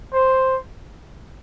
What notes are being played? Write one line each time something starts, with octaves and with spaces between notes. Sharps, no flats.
C5